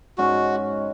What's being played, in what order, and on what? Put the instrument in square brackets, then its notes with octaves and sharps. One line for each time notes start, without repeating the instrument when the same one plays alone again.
[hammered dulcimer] G#2 G#3 C#4 [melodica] F#4